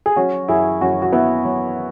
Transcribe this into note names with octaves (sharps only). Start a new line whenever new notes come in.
G#4
F#3 C#4 F#4
F#2 E4 G#4
F#2 C#4 F#4
F#4
F#3 B3 E4
F#3